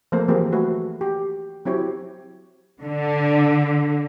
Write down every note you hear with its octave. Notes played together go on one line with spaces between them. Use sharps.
F3 A3 A#3 C4 A4 C5
E3 F#3 A#3 C4 G4 G#4
A3 F#4 B4
G4
F#3 C4 E4 G4 C#5
D3